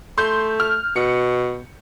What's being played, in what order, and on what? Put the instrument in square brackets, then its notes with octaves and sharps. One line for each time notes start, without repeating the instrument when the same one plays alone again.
[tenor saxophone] A3 [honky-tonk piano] C6 G6
[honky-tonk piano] F6
[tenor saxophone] B2 [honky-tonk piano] C#7